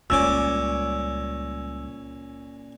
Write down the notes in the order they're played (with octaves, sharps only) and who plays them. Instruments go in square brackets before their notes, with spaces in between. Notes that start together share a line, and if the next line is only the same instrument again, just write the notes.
[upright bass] C#2 G3 [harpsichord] A#2 C#4 D6 [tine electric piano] E6